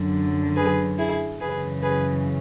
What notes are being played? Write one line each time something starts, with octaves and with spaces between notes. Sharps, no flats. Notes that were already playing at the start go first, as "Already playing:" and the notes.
Already playing: F#2 D3 F#3
G#4 B4
E4 G#4
F#2 C#3 E3 G#4 B4
G#4 B4